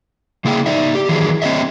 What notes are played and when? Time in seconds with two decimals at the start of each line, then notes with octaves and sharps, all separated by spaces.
0.45 C#3 A#3 E4 G#4 G5
0.66 D#4 D5 E5
0.95 G4
1.09 D#3 E3 F#3 G#4
1.42 C4 C#5 D#5 E5